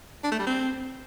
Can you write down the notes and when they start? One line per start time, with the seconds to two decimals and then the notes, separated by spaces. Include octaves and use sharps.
0.24 D4
0.31 A3
0.39 G3
0.46 C4